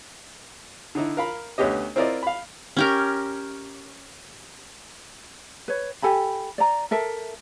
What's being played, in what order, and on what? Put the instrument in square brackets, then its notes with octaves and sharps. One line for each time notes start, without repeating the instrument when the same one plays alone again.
[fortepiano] D3 D#4 E4
A#4 F5 B5
D2 B3 C#4 G4 D#5
C4 E4 F4 A#4 D5 D#5
F5 B5
[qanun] C#4 G4 A#4
[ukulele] B4 C#5
G4 A4 G#5 B5
D5 A#5
A4 A#4 E5